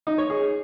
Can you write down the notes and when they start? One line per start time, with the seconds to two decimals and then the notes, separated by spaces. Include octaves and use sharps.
0.07 D#4
0.18 C#5
0.30 G#4